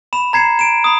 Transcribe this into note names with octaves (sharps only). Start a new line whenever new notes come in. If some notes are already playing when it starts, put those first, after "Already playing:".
B5 E7
A#5 G#6 C7 C#7 E7
D7 E7
B5 D#6